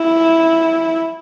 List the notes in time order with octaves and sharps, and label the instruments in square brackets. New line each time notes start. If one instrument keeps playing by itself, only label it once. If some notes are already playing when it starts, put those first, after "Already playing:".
Already playing: [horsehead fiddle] E4